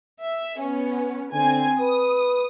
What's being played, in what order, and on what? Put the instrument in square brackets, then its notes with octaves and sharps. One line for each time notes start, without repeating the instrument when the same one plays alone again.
[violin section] E5
B3 C#4
[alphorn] D3 [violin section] C4 G#5
[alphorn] B4 [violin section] D#6